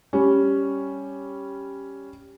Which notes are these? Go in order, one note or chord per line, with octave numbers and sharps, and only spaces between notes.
G3 C#4